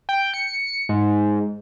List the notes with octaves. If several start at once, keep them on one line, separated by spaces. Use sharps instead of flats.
G5
C#7
G#2